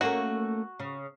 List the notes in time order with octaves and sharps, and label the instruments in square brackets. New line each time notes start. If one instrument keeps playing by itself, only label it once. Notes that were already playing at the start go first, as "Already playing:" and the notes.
[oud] A3 A#3 C#4 [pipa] F#4
[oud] C#3